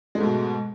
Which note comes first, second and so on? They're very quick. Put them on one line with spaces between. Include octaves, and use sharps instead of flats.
G#3 A3 G#2 B2